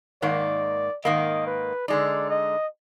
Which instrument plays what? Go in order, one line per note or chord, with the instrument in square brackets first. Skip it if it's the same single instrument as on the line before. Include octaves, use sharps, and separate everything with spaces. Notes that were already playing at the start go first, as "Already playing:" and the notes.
[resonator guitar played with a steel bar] G#2 D#3 A#3 [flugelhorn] D5
[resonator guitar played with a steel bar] G#2 D#3 A#3 [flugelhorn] D#5
[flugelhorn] B4
[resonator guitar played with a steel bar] D3 G#3 D#4 [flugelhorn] D5
[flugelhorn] D#5